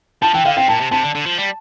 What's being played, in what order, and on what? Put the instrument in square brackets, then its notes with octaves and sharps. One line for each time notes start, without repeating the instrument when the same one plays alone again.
[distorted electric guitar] F3 [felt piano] A5
[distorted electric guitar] E3 [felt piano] G5
[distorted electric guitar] D3 [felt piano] F5
[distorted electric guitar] C3 [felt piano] G5
[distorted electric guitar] A#2 [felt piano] A5
[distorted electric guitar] C3
[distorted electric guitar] C3 [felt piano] A5
[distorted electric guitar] D3
D3
F3
G3